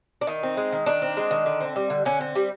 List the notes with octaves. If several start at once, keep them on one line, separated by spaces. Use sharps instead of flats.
D4
D#3 D#4
C4
G#3
D#3
D#3 D4
C4
G#3
D#3
D3
C4
G3
D3
D3 C#4
C4
G3